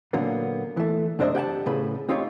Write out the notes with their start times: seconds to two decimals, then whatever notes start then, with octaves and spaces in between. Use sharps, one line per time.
0.13 A#2 D3 F#3 A#3 B3
0.77 E3 A3
1.19 F#2 C3 D4 C5 D#5 E5
1.35 G4 F#5 G#5 A5
1.66 A2 C#3 B4 B5
2.09 C4 D#4 F4 G4 C#5